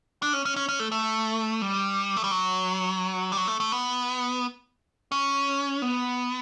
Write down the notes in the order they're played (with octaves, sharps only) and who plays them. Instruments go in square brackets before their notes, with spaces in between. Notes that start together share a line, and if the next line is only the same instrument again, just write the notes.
[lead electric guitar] D4
C#4
C#4
C#4
C#4
A3
A3
G3
A3
G3
F#3
G3
F#3
A3
A3
B3
C#4
B3